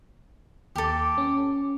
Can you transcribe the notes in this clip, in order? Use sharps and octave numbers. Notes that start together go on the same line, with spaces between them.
D#2 G4 A4 D6
C#4